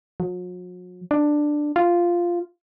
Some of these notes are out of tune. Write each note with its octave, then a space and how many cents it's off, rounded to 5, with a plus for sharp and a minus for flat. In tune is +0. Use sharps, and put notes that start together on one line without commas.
F#3 -45
D4 +10
F4 -5